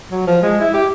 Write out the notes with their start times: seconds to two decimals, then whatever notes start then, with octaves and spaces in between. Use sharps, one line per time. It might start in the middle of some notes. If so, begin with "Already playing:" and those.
0.11 F#3
0.27 F3
0.42 G#3
0.61 E4
0.74 G4